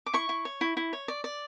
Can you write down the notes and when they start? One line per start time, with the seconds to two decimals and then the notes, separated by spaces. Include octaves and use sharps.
0.06 D6
0.13 E4 C#6
0.29 E4
0.45 C#5
0.61 E4
0.77 E4
0.93 C#5
1.08 D5
1.24 D5